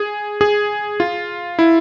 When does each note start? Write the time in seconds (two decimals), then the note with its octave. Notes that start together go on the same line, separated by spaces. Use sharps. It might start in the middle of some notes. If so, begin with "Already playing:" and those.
Already playing: G#4
0.41 G#4
1.00 F4
1.59 E4